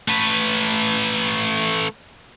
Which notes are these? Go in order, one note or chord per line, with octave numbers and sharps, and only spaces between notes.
A3 B4